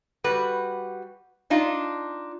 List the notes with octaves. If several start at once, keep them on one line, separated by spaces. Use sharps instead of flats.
G3 F#4 B4
D4 D#4 F4